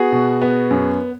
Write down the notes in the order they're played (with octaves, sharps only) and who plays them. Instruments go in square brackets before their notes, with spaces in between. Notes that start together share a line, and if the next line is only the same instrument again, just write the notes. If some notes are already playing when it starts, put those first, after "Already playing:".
Already playing: [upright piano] B3 F#4 G#4
B2
B3
F#2